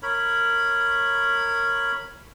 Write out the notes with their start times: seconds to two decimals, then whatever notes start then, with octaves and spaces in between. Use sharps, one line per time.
0.03 A#4 C#5 B5